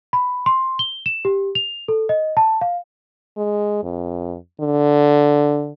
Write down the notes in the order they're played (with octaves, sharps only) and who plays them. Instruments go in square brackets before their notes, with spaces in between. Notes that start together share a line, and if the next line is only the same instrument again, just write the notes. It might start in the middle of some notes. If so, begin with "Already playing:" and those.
[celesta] B5
C6
G7
E7
G4
F7
A4
D#5
A5
F5
[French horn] G#3
F2
D3